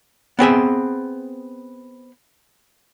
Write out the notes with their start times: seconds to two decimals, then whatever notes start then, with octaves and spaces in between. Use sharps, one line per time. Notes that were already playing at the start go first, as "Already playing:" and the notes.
0.39 B3 C4 G#4 E5